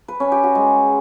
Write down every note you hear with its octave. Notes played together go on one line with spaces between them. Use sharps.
B4
C#4
G4
F#4
G#3